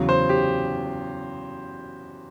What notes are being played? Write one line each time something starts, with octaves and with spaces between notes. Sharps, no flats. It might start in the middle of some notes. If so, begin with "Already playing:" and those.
Already playing: E2 C#3 F#3
C5
G4